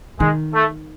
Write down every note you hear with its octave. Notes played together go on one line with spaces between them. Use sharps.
D#3 G#3
A3